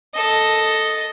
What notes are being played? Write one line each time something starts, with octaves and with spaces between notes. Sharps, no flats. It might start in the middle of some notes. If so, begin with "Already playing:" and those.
A4 D#5